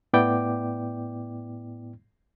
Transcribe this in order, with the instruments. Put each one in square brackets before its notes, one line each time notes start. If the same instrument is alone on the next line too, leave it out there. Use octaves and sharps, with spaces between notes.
[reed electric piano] A2 B3 E4 D5 G5 D6